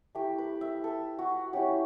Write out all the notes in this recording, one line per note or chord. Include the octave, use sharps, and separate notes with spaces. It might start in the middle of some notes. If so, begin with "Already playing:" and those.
A3 E4 G4
B4
E5
A4
F#4
F#3 C#4 E4 G4